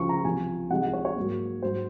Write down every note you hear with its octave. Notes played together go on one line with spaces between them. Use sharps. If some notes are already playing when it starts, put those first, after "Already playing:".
Already playing: C#2 C#3 F3 C#6
A#5
C2 C3 F3 C4 F4 G#5
C2 C3 F3 G#3 D#4 F#5
F#5
C#5
C#5
G#2 F#3 A#3
G#2 F#3 C5